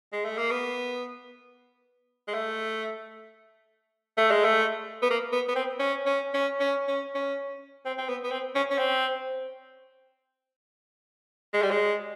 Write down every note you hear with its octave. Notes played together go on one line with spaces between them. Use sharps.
G#3
A3
A#3
B3
G#3
A3
A3
G#3
A3
B3
A#3
B3
B3
C4
C#4
C#4
C#4
C#4
C#4
C#4
C4
C4
B3
B3
C4
C#4
C#4
C4
G#3
G3
G#3